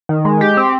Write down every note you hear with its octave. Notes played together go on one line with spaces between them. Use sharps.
D#3
G#3
G4
C4